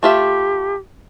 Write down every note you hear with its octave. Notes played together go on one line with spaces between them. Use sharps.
A3 F4 G4 E5